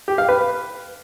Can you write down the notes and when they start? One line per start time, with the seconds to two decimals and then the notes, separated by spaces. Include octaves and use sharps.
0.08 G4
0.18 F5
0.29 B4